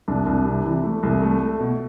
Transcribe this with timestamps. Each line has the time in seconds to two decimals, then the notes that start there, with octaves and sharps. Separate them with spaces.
0.08 C2 D4
0.27 C2
0.45 C3
0.65 E3
0.84 A3
1.03 C2
1.22 A3
1.41 A3
1.60 B2